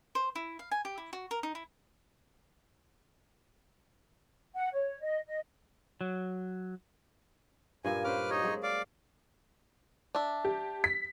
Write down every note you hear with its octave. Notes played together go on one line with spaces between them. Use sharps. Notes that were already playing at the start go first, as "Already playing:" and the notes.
C5
E4
F5
G#5
G4
E4
F#4
A#4
D#4
E4
F#5
C#5
D#5
D#5
F#3
G2 A#2 A#3 G#5
C#4 B4 C5 D6 F6
D#4 G4 C#5 D#5
F#3 G#3 G#4
D5 F5 D6
D4 E5
G4
B6